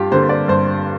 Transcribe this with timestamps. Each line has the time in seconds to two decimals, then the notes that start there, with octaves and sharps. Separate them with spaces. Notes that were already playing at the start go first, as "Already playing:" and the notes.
Already playing: G2 F4 G4
0.11 D3 G3 A#3 C5
0.29 D5
0.48 G2 C5